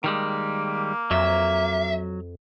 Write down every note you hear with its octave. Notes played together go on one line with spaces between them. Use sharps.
D#3 G3 G#3 A#3
F2 F#3 E5